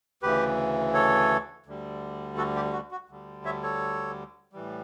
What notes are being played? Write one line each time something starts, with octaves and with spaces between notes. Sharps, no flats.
D2 C#3 E3 G4 B4
A4 C#5
D2 D3 G3
F#4 A4
G4
F#4
F#4
D2 D3 G3
C#5 E5
A4 C#5
A2 E3 G3